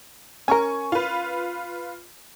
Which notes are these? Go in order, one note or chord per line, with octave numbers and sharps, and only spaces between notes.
C#4 A#4 G#5 C#6
F4 B4